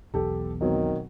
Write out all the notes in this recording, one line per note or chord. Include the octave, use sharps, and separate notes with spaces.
B1 E2 G4 A4
B2 D#3 F#3 C4